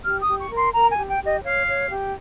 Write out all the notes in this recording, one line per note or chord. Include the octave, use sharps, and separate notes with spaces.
G4 F6
D#6
G4
C#6
A#4
C6
A#4 A#5
G#5
G4
G5
G4
D#5
C#5 F5
C#5
G4